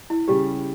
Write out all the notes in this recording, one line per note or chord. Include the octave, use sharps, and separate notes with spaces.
E4
C#3 G3 C#4 G4